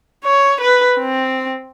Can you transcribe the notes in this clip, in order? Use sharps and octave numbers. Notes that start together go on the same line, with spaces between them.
C#5
B4
C4